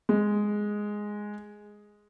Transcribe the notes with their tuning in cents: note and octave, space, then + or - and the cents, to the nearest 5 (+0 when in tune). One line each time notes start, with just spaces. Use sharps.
G#3 +0